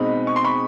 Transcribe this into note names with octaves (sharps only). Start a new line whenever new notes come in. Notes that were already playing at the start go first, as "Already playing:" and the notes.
Already playing: B2 G#3 C4 D#4 B5
C#6
C6
B5 C#6